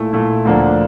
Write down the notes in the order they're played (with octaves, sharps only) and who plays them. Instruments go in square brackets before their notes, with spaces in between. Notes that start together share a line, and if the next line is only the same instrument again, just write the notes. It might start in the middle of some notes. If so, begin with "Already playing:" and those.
Already playing: [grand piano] A#2 A3 E4
A#2 A3 E4
D2 D3 F3 A#3 D4